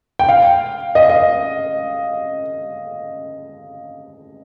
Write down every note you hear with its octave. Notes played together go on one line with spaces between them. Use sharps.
G5
F5
D#5
D#5